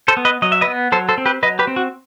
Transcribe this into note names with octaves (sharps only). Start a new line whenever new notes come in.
A4 C5
B3
B4 D#5
F#3 D#5
E5
B4 D#5
B3
F#3 A4 C5
A4 C5
C4
G4 B4
F#3 B4 D#5
G4 B4
C4
F#4